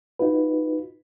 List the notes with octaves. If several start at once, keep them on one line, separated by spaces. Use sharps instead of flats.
D#4 F4 F#4 B4